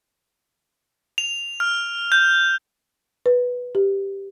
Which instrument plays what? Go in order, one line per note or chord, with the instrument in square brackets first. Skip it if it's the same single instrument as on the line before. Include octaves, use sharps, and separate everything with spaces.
[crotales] F7
F6
G6
[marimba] B4
G4